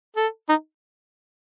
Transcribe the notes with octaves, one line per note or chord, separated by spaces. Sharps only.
A4
D#4